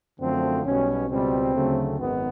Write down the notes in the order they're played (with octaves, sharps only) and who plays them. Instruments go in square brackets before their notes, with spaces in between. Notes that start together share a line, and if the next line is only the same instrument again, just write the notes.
[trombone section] F#2 D3 F3 A3 C4
B1 B2 G3 C#4
C#2 B2 G3 C4
D2 C#3 F#3 A3
G#1 F#2 D#3 B3